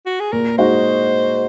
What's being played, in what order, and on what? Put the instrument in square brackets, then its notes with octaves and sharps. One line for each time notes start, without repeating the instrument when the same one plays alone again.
[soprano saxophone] F#4
G#4
[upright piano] A#2 [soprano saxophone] A#4
[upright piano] G#3 D#4 F#4 [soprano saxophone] C5